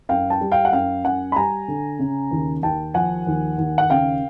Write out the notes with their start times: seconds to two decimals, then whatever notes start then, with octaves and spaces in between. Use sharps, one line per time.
0.09 F#2 F5 G5
0.30 G5 A5
0.41 G3
0.52 F5 G5
0.65 F#5
0.73 F#2 F5 G5
1.05 F#2 F#5 G#5
1.32 B5
1.36 G3 G#5 A#5
1.68 D3
1.99 C#3
2.31 D#2
2.63 D#2 G5 A5
2.94 F3 F#5 G#5
3.27 D#2
3.58 D#2
3.78 F#5
3.90 C#3 F5 G5